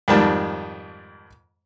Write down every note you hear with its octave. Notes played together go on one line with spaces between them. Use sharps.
F2 G#2 D#3 G3 A5